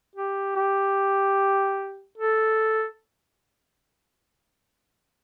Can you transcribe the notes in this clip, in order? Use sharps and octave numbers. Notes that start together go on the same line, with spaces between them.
G4
G4
A4